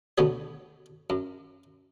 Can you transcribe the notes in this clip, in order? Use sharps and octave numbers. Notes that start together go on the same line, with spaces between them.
D2 B2 D3 B3 G4 C#5
F#2